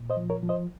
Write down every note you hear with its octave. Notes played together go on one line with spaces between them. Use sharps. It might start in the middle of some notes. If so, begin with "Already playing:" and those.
Already playing: A#2
C5 D#5
F3
A#4 C#5
F3
C5 D#5